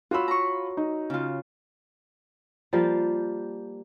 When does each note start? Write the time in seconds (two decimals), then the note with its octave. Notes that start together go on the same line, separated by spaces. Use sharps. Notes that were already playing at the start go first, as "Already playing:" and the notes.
0.11 F4 F#4 C#5 B5 E6
0.28 A#5 C#6
0.77 D#4
1.10 C#3 F4
2.73 F3 G3 A#3 F5